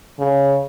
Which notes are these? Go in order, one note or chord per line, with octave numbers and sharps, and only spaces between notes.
C#3